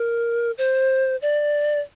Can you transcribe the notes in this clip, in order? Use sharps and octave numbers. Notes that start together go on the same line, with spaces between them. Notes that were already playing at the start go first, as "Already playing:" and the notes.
Already playing: A#4
C5
D5